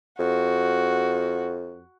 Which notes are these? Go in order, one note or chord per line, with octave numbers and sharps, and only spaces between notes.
F2 F#4